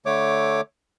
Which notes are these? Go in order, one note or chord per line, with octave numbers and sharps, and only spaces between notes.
D3 A3 C#5 D6